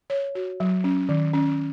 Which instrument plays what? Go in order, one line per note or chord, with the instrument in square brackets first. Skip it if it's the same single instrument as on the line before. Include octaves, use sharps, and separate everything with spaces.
[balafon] C#5
F#4
F#3
C#4
D#3
C#4